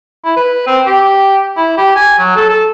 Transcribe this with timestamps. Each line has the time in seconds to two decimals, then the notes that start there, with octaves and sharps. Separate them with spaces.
0.24 E4
0.36 B4
0.67 C4
0.86 G4
1.57 E4
1.77 G4
1.95 G#5
2.18 F#3
2.36 A4
2.49 A4